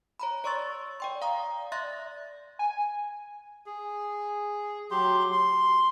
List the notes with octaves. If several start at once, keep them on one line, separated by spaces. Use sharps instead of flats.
C#5 A#5 B5
C#5 D5 C6 C#6 E6 A6
D5 G5 C6
F5 A#5 D#6
D5 E5 C6 F#6 A6 A#6
G#5
G#4
F#3 G4 C6
C6